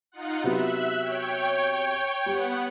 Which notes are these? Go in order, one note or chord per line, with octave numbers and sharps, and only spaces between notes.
D#4 F4 F#5
C3 F#3 B3 E5 F#6
C#5 G5
G3 B3 F#5